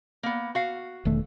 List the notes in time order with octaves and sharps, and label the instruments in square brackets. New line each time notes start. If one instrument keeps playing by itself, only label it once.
[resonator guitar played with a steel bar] A#3 B3
F#4 F5
[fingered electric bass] E1 D#3 A3